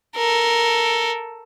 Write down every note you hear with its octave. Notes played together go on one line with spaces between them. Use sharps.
A4 A#4